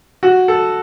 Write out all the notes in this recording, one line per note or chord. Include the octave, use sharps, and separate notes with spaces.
F#4
A4